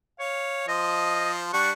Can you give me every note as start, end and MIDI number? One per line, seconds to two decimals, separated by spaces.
0.19 0.67 73
0.19 0.66 77
0.68 1.49 53
0.68 1.49 72
0.68 1.31 75
1.53 1.71 55
1.53 1.71 62
1.53 1.71 78
1.53 1.71 85